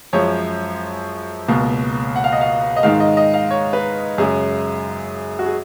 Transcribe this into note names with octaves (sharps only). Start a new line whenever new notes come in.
F#2 F3 G#3 C#5
C#2 B2 A#3
F#5
F5
D#5
F5
D#5
G#2 D#3 G#3 F5
D#5
D#5
F5
C#5
B4
F#2 C#3 G#3 G#4
F#4
G#4